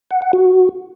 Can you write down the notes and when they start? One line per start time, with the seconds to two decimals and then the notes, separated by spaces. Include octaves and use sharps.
0.11 F#5
0.22 F#5
0.33 F#4